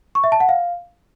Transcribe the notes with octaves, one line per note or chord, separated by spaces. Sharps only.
C#6
E5
A5
F#5
F5